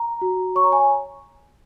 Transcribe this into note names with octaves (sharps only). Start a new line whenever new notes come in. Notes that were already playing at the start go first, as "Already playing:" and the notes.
Already playing: A#5
F#4
C#5 C#6
A#5
G#5